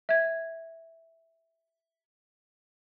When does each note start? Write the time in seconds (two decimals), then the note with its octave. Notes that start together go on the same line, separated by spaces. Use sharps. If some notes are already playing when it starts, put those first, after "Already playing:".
0.09 E5 G#6